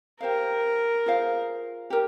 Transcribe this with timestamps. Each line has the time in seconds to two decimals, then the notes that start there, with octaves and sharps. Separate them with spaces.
0.21 G4 A#4 C5 F5
1.06 F4 G#4 C5 F5
1.90 G4 A#4